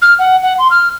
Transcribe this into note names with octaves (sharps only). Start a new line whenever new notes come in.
F6
F#5
F#5
C6
F6